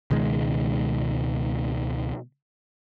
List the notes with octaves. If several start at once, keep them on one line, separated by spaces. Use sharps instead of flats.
C#2 B2 D#3 G#3